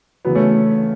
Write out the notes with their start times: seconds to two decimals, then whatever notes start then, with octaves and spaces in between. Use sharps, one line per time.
0.25 E2 C#3 F#3 B3
0.35 A3 C#4